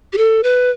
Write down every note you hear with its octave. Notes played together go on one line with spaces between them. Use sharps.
G4
A4
B4